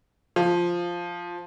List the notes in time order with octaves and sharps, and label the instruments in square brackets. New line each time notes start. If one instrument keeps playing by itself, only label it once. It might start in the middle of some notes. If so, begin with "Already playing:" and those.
[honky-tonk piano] F3